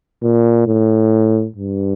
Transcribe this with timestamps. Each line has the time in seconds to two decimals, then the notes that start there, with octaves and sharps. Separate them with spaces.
0.22 A#2
0.67 A2
1.57 G2